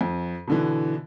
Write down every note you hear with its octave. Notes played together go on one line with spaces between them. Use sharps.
F2
B2 D3 E3